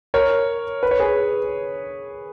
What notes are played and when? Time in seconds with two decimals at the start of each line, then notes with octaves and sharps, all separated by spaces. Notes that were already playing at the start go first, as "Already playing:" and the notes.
0.14 A#4 C#5
0.83 B4
0.91 C#5
1.00 G#4 B4